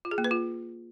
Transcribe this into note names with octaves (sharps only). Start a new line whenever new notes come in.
F4
G#4
A#3
B4
F4